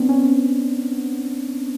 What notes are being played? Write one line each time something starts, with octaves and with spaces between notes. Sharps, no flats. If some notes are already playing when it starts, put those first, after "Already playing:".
Already playing: B3 C4 D4
C#4